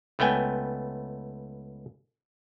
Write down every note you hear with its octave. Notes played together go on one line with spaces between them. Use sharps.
C#2 A3 B3 G5 G#5